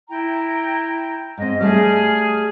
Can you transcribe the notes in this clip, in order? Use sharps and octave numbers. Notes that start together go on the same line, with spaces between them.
E4 G5 A#5
G#2 C4 D#5
G3 A3 G#4 E5 F6